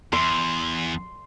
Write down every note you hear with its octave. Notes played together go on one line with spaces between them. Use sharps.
E2 C6